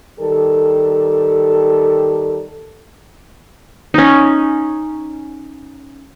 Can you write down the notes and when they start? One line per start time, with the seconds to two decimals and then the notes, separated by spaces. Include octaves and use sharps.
0.20 D#3 G3 G4 A4
3.94 C#4 D#4